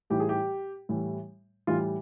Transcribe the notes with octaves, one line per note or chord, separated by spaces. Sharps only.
A2 E3 G3 G4
G#4
G4
A2 E3 G3
A2 E3 G3 F4